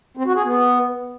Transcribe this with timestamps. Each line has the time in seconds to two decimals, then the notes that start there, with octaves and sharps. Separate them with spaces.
0.17 C4
0.26 F#4
0.35 G#4
0.44 B3